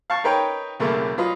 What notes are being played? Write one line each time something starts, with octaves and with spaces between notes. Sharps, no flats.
F5 A5 C#6 F#6
D#4 A#4 B4 C#5 G5
B1 E2 C#3 A3 A#3
F#3 F4 B4 D#5